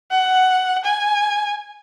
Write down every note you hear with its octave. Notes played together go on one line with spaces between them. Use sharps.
F#5
G#5